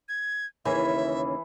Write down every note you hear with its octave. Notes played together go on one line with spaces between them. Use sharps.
G#6
D#2 C#3 E3 E5 G#5